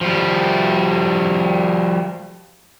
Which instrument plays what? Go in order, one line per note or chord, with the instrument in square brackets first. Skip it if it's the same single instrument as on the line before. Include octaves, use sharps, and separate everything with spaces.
[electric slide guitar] F3 G3